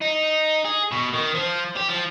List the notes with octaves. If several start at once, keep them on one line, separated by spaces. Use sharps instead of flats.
D#4
G#4
B2
D#3
F3
G4
F3